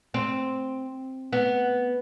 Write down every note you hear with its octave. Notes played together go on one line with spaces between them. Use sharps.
C4
B3